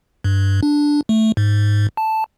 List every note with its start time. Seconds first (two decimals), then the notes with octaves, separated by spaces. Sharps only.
0.24 G2
0.63 D4
1.09 A3
1.37 G#2
1.97 A5